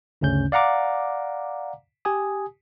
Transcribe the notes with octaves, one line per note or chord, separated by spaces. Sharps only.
G1 D2 C#3 C#4 G6
D5 F5 F#5 A#5 D6
G4 G#5 D#6